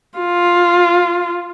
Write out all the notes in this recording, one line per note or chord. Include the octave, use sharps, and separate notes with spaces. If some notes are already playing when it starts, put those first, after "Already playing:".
F4